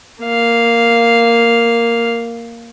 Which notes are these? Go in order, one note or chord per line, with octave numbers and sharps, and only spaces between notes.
A#3 F5